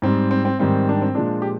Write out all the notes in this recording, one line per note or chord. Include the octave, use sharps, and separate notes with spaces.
G#2 G3 C4
C4
C4
G#2 D#3 G3 C4
D4
C4
A#2 F3 G#3 D4
G4